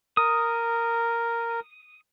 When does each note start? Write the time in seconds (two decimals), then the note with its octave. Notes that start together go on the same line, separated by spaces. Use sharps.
0.17 A#4 D#6